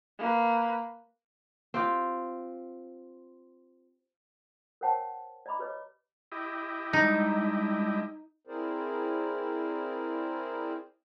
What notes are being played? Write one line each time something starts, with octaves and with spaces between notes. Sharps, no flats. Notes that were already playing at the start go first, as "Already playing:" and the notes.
A#3 B4
C4 F4 G4
A#4 C5 C#5 F#5 G5 A5
D5 D#5 A#5 B5 D6
G4 B4 C#5 D#5 D6
E4 G4 D#5
G3 G#3 D4 D#4
C4 E4 G#4 A#4 C5 D5